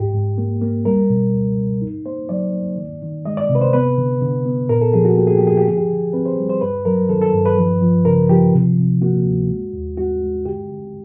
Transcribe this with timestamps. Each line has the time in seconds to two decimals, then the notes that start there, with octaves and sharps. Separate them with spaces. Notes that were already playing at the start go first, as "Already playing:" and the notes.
Already playing: G#2 G4
0.13 G#2
0.38 A#3
0.62 A#3
0.85 G3 A#4
1.10 B2
1.33 C#2
1.58 B2
1.82 D#4
2.05 A#3 C5
2.29 F#3 D5
2.53 A#3
2.77 D#3
3.02 D#3
3.25 G#3 D#5
3.37 D5
3.49 C3
3.55 B4
3.61 C5
3.73 B3 B4
3.98 D3
4.21 D3
4.45 B3
4.69 A#2 A#4
4.81 A4
4.93 F3 G#4
5.05 F#4
5.17 A#3 G4
5.27 G#4
5.38 F3 G4
5.47 G#4
5.57 G4
5.65 D3 G#4
5.77 G4
5.89 D3
6.13 C4 B4
6.26 C5
6.37 G3
6.50 C5
6.61 G2 B4
6.85 F#3 A#4
7.09 D#3 A4
7.22 A4
7.33 G2
7.46 B4
7.57 F3
7.81 F3
8.05 C#3 A#4
8.29 F3 G4
8.53 C3
8.77 C3
9.02 A#3 F#4
9.25 D2
9.49 G#3
9.73 D#2
9.97 G#3 F#4
10.21 G#3
10.45 D3 G4
10.70 D3